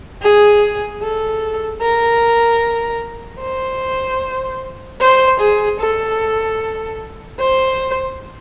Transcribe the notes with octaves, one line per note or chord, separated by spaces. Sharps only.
G#4
A4
A#4
C5
C5
G#4
A4
C5